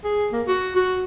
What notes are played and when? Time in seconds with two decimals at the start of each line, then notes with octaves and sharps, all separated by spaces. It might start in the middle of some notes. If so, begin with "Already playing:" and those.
0.04 G#4
0.33 A#3
0.48 F#4
0.76 F#4